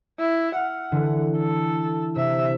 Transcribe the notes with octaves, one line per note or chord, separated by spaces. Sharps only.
E4
F#5 F6
D3 E3
A4
C3 E5